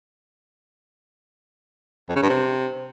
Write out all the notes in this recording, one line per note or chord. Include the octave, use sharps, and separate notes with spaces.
F2
C#3
G2
C3